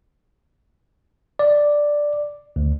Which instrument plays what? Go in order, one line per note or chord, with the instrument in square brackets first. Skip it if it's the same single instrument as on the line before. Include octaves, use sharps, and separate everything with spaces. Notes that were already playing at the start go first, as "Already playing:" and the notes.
[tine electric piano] D5
D2